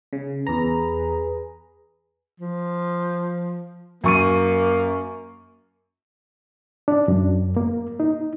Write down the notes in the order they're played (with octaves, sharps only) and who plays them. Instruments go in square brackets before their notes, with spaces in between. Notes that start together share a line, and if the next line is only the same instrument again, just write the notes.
[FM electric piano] C#3
[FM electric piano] E2 A#5 [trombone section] G#4 B4
[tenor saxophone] F3
[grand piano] F#2 C#6 D#7 [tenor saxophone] A#3
[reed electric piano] D4
F#2
A#3
D#4